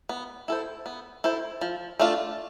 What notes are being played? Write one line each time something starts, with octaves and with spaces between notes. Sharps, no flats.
B3
E4 A4 C5
B3
E4 A4 C5
F3
A3 D4 F4